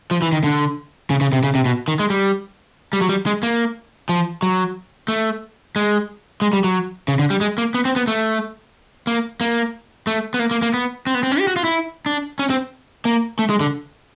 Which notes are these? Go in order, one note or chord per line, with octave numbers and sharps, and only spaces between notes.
F3
E3
D#3
D3
C#3
C#3
C3
C#3
C3
B2
D#3
G#3
G3
G3
F#3
G3
G#3
A#3
F3
F#3
A3
G#3
G#3
G3
F#3
C#3
D3
G3
G#3
A#3
B3
C4
B3
A3
A#3
A#3
A3
B3
A#3
A#3
A#3
B3
C4
B3
C4
C#4
G4
F#4
F4
E4
D4
C#4
C4
A#3
A3
G#3
D3